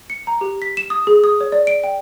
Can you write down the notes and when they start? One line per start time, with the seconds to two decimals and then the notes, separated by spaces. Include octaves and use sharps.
0.10 C#7
0.27 A#5
0.41 G4
0.62 B6
0.77 E7
0.90 D#6
1.07 G#4
1.24 D#6
1.41 C#5
1.52 D5
1.67 D7
1.84 G5